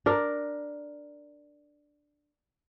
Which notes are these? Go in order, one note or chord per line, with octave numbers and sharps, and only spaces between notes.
D4 A#4